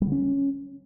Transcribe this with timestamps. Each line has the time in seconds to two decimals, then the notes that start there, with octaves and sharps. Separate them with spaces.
0.02 G3
0.07 D3
0.12 C#4